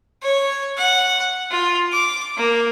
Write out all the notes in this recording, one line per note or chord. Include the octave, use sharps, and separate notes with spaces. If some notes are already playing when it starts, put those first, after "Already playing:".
C#5
F#5
F4
D6
A#3